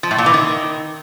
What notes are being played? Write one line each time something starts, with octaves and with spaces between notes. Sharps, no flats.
F3
A2
A#2
E3
D#3